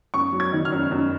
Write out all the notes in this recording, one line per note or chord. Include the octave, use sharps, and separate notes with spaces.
F#2 C#6
F#3
G#6
D#3
F6
F#2
F#2